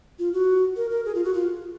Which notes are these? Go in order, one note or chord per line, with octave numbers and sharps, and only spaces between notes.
F4
F#4
A#4
A#4
G#4
F4
F#4
F4